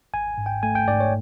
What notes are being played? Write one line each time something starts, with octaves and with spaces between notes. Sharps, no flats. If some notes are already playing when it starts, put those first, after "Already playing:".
G#1 G#5
G#2
G5
A3 G#5
G5
G#2 D5
C#5